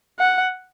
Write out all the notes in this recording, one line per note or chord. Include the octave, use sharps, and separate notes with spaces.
F#5